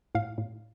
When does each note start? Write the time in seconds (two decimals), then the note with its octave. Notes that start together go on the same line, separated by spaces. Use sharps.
0.15 A2 F5
0.38 A2